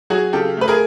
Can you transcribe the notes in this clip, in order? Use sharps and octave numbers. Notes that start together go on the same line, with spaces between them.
F#3 F#4 G#4
C#3 G4 A4
A3 B4
G#4 A#4